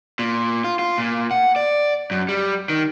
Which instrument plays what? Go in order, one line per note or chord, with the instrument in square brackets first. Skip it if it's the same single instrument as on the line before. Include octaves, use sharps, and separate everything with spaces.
[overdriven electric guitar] A#2
F4
F4
A#2
F#5
D5
F#2
G3
D#3